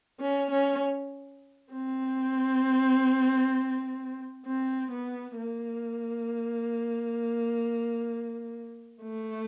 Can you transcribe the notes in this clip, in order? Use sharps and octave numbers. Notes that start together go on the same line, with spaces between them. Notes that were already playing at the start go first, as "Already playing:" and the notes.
C#4
C#4
C4
C4
B3
A#3
A3